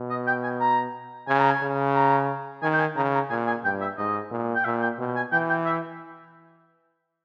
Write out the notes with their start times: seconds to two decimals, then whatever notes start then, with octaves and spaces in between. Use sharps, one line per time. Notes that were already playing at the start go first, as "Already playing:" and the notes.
Already playing: B2
0.10 D#5
0.27 G5
0.43 G#5
0.60 A#5
1.28 C#3 G#5
1.40 A#5
1.51 G#5
1.62 C#3
1.95 A#5
2.62 D#3 G#5
2.73 G5
2.79 G#5
2.96 C#3 A#5
3.14 A#5
3.30 A#2 G#5
3.47 G#5
3.64 G2 G5
3.81 E5
3.98 G#2 D#5
4.31 A#2
4.55 G5
4.65 A#2 E5
4.82 G5
4.99 B2
5.16 G#5
5.32 E3 G5
5.50 G5
5.66 E5